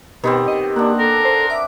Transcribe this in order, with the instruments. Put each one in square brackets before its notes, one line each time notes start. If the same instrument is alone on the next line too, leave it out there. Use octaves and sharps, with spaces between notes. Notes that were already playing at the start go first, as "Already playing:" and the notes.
[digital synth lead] B2 [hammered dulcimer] D#3 B3 C4 [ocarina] G4
[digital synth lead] D#5
[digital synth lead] A#3 [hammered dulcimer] D4 F#5
[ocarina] A4 [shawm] A#4
[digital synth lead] C5
[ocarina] E5 [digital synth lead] D6